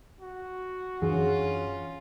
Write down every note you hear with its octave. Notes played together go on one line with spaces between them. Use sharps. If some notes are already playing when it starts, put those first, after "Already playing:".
F#4
F#2 E3 C#4 D4 F4 G#4